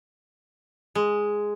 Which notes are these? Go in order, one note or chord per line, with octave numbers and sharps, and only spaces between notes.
G#3